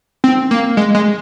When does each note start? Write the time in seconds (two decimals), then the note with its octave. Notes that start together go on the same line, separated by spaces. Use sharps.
0.24 C4
0.51 A#3
0.77 G#3
0.95 G#3